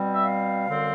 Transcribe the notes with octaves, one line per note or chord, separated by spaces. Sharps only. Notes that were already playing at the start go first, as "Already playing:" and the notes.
Already playing: B2 G3 C4
E5
F5
F#2 D3 G3 C4